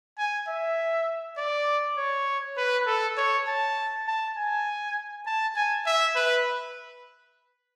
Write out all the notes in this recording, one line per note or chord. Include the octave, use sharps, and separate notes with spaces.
G#5
E5
D5
C#5
B4
A4
C#5
A5
A5
G#5
A5
G#5
E5
B4